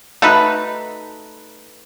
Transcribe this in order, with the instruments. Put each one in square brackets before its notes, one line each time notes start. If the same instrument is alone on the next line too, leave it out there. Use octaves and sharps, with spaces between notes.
[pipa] A3 D#4 F#4 B4